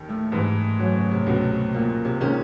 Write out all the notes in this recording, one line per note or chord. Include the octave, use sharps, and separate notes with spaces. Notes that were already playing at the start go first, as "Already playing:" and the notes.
Already playing: D#2 D#3
A2 A3
G#2 E3 G3
F#2 F#3
C#3
C3
C#2 B2 F#3
A#2
C3
A#2 D#3 G#3 C#4